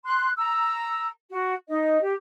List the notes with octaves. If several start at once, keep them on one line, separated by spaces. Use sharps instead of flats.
C6 F#6
A#5 E6
F#4
D#4 D#5
G4